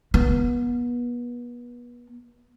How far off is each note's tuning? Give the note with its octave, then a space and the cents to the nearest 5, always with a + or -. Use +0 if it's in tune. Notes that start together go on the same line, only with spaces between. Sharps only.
B3 -35